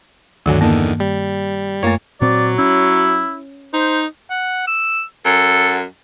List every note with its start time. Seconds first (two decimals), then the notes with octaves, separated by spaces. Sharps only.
0.46 D2 G2 D3 D#3 F#3
0.61 E2 D3 D#3 A#3
1.00 G3
1.83 F#2 A3 A#3 C#5
2.21 A#2 F#3 C4 D5
2.58 C#4 E4
3.74 D#4 C5
4.30 F#5
4.67 E6
5.25 F#2 A4